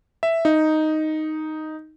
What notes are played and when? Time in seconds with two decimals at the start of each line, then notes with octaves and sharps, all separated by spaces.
0.23 E5
0.45 D#4